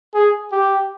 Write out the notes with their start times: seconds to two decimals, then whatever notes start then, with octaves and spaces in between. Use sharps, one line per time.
0.14 G#4
0.52 G4